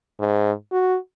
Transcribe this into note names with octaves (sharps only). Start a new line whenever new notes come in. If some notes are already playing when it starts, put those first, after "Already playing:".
G#2
F#4